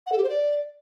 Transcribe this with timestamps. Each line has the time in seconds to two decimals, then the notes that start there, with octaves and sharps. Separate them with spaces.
0.07 F#5
0.12 A4
0.18 G4
0.23 C5
0.29 D5